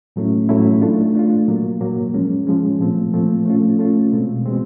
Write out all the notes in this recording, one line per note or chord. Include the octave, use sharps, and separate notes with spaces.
A2 F#3 A3 C#4 E4
A2 F#3 A3 C#4 E4
A3 D4 F4
A3 D4 F4
A#2 F#3 A#3
A#2 F#3 A#3
F3 G#3 C#4
F3 G#3 C#4
A#2 F3 A3 C4
A#2 F3 A3 C4
A3 C#4 F4
A3 C#4 F4
B2 G#3 C4
B2 G#3 C4